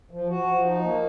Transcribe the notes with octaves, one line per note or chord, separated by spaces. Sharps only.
F3
F#4
F3
D#4
A#3